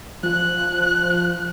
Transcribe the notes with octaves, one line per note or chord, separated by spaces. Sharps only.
F3 F#6